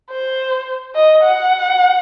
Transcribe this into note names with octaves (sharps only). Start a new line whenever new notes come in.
C5
D#5
F#5